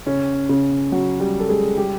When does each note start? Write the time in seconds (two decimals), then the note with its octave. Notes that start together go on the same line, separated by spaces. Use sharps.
0.06 C#3 C#4
0.49 C#3 C#4
0.92 F#3 F#4
1.20 G3 G4
1.40 A4
1.49 G#3 G#4
1.77 G3 G4